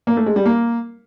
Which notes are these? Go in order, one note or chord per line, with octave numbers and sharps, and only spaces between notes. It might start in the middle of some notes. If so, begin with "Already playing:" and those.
A#3
A3
G#3
G3
A#3